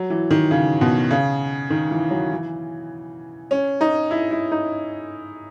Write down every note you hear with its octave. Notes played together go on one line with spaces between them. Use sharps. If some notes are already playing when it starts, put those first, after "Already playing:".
Already playing: F#3
E3
D#3
C#3
B2
C#3
D#3
E3
F#3
E3
C#4
D#4
E4
E4
D#4